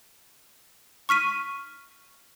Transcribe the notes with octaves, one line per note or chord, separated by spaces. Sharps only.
C#6 F6 B6 D#7